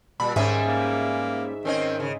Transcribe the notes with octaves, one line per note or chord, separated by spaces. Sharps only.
A#2 G3 B5
G#2 D#3 G3 C#4 G#4 E5
A#3
D#3 C4 C#4 D#5
C#3